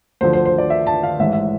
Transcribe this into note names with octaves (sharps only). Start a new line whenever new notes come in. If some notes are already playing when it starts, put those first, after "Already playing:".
D2 D3 F3 C5
C5
C5
D5
E5
A5
F5
A1 G#2 E3 E5
E5